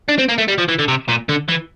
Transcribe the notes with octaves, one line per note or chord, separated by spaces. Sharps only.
D4
C4
A#3
A3
G3
F3
E3
D3
C3
A#2
D3
E3